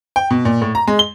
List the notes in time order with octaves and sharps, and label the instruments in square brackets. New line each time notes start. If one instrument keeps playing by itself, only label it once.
[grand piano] G5
B2
A#2
A2
A#5
G#3
G7